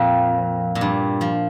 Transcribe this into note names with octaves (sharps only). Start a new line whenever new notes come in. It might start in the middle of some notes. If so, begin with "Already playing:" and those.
Already playing: F2 A#2 F3
A#2
G2
F3